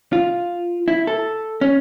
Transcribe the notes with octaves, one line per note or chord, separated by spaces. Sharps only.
F4
E4
A4
C#4